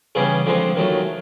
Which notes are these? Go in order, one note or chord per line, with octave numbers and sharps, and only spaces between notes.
C#3 E3 G3 B3 G#4
D3 F3 G#3 C4
D#2 D#3 F#3 A3